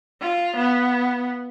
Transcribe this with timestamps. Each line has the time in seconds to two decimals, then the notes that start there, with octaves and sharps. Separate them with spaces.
0.21 F4
0.56 B3